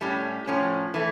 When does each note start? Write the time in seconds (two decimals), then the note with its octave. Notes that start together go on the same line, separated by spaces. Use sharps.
0.01 A2 G3 C#4
0.47 A2 F3 C#4
0.94 E3 A3